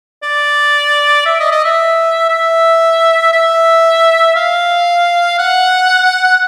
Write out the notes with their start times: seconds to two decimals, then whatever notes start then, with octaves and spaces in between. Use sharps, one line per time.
0.23 D5
1.26 E5
1.40 D#5
1.52 D#5
1.65 E5
2.29 E5
3.33 E5
4.36 F5
5.39 F#5